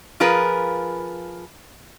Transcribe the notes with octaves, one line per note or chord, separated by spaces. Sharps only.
F3 F4 G#4 A#4 B4